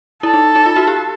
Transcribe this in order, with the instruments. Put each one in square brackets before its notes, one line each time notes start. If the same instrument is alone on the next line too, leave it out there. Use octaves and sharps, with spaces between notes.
[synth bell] E4 [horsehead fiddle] A4
[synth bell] D#4
D#4
F4
F#4
G4